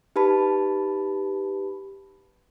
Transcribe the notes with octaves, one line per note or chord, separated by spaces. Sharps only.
D#4 G4 B4 A5 B5